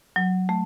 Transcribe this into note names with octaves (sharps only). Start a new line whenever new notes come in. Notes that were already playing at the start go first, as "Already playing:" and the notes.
F#3
A3